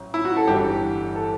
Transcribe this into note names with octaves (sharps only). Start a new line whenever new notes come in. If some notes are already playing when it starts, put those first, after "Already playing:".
Already playing: A1 F#3
E4
F#4
A4
G1 G2 E3 G4
A4